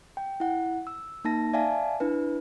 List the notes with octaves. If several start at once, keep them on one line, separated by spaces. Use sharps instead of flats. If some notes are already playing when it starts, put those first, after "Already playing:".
G5
E4 F#5
E6
A#3 D#4 A5 A#6
D5 E5 F5 G#5 A5
D4 E4 B4